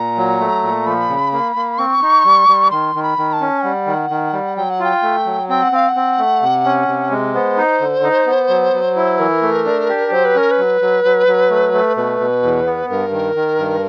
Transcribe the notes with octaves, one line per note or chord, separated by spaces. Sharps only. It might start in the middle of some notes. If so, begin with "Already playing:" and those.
Already playing: A#2 A#5
F#3
A3
A#2
F3 B5
C#3
A#3
A#3
C4 C#6
D#4
G3
G3
D#3 C6
D#3
B5
D#3
A5
C#4
G3 F#5
D#3
D#3
G3
F#3 G5
F#5
F4 G5
A3
F#3
C4 G5
F#5
C4 F5
F#5
C4
A3
C3
C#4
C3
G#3
B3 C5
D#4
D3
D#4
B3
F#3
F#3
E4
E3 A#4
A3
D4
G4
F#3 C5
B4
C#4 A#4
B4
F#3
F#3
F#3
F#3
A3
A3
B2 B4
B2
E2
B3
G2 A#4
D#3
D#3
G2